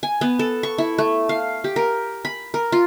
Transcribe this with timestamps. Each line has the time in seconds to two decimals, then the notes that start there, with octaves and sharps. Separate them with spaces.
0.03 G#5
0.21 B3
0.39 A4
0.63 C#6
0.78 E4
0.98 A3
1.29 F5
1.64 G4
1.76 A#4
2.25 B5
2.54 A#4
2.72 F4